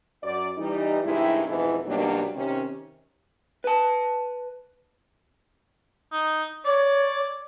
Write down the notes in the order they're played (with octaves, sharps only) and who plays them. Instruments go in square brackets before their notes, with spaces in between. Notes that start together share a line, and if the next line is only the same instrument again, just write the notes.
[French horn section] F#2 D5
E3 G3 D#4
G2 C3 D#3 G#3 E4
F2 G#2 B2 E3
B2 D#3 F#3 G3 A#3 D4
C3 D#3 C#4
[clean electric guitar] B4 A5
[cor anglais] D#4
[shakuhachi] C#5 [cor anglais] D5